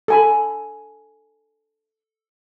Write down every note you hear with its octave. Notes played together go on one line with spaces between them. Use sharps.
A4 G#5 B5